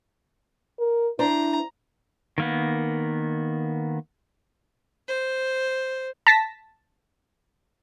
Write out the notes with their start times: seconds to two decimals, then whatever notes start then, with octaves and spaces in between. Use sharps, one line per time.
0.79 A#4
1.19 D4 E4 C5 A#5
2.38 D#3 A#3 B3
5.08 C5
6.27 A5 A#6 B6